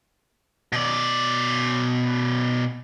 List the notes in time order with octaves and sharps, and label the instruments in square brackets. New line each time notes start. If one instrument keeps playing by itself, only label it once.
[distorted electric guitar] B2 D5